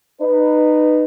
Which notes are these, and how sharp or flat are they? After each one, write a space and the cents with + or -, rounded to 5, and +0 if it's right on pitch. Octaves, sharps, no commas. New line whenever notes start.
D#4 -25 B4 +0